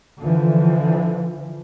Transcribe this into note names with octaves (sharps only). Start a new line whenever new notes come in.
D3 E3 F3